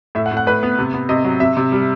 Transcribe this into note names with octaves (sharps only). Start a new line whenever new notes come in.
A2 E5
F#5
A2
F#5
A2 B4
B3
C3
B3
C3 D#5
F#3
C3 E5
C3
G3